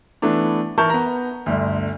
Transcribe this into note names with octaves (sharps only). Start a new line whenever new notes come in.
E3 A3 B3 D4
E3 E4 A#4 A5 C#6 G6
B3 A#5
G1 D2